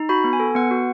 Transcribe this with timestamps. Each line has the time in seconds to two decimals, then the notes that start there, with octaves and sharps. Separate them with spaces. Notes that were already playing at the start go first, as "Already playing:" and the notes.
Already playing: D#4
0.09 F#4 B5
0.24 B3
0.33 G#5
0.40 A4
0.55 B3 F#5
0.71 F#4